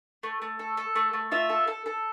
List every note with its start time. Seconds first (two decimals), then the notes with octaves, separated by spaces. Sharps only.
0.23 A3
0.42 A3
0.59 A4
0.77 A4
0.96 A3
1.13 A3
1.32 F4 E5
1.50 A4
1.68 A4
1.86 A4